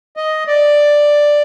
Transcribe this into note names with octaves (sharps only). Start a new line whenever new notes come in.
D#5
D5